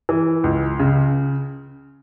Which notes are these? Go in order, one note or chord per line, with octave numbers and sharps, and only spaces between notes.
E3
C#2
C#3